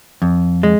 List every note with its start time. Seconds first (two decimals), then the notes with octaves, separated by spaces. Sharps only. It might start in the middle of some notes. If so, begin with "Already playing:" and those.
0.22 F2
0.63 G#3